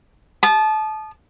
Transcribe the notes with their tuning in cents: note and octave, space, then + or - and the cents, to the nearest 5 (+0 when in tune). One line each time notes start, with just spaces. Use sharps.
A5 -25 D#6 -30